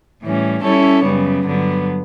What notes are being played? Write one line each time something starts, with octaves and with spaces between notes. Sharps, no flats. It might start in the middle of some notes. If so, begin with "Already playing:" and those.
A2 E3 G3 C#4
G3 C#4 E4 A4 C#5
F#2 C#3 G3 B3
G2 D3 F#3 B3